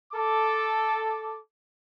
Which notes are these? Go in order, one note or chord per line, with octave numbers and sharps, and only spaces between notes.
A4 D6